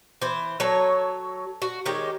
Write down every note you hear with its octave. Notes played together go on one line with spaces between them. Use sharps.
E3 C5
F#3 A4 C#5
F#4
D#3 G#3 G4 C#5